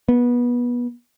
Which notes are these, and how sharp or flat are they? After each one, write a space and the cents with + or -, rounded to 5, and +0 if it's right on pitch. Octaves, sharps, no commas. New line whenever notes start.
B3 -25